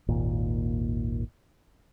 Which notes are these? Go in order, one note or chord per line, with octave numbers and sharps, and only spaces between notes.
G#1 D#2 A#2